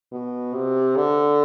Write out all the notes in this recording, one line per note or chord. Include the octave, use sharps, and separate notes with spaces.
B2
C3
D3